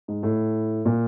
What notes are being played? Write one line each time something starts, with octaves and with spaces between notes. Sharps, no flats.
G#2
A2
A#2